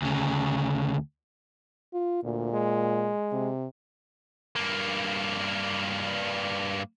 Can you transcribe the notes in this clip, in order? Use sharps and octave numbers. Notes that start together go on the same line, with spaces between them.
D2 C#3
F4
D2 A#2
G#3
C3
G2 A#3